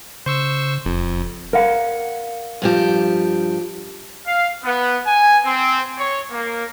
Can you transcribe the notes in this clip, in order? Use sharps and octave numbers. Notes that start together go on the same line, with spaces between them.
C#3 C5 C#6 E6
E1 F2
A#4 F5 F#5
G2 F3 G4
F5
B3
G#5
C4
C#5
A#3